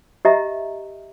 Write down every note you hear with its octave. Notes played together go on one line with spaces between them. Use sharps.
G4 D#5 E5 A#5